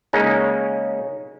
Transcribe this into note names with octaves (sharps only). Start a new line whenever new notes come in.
C#3 G#3 A#3 C#4 D#4